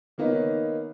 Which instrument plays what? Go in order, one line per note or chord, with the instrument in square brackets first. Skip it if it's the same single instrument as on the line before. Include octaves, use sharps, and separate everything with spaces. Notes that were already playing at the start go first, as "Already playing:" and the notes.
[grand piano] D#3 A#3 B3 D#4 C#5